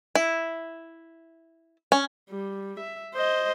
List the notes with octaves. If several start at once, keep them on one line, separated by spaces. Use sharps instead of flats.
E4
C#4
G3
E5
C5 D#5